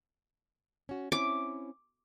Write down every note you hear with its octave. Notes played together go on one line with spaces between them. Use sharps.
C#4 F#4
C4 C#4 E4 D6